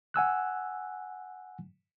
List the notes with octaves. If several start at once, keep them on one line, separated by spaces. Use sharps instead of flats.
F#5 G#5 E6 F#6